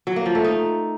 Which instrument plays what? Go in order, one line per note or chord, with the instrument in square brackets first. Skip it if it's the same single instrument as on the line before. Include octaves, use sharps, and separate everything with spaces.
[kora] F#3
A#3
F3
A3
D#4